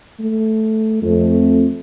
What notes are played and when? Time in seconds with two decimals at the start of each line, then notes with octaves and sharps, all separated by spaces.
0.19 A3
1.03 F2 A3